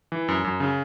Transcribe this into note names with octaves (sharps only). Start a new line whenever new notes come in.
E3
F#2
F#2
C#3